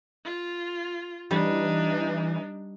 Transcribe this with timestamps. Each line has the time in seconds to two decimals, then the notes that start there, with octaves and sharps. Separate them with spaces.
0.25 F4
1.31 E3 G3 D4 D#4